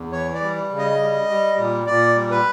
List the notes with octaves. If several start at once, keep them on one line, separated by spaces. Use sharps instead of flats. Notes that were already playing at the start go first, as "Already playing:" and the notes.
Already playing: E2
E3 C#5
D5
G3
C#3
D#5
G3
G3
A#2
A#2 D5
G3
B4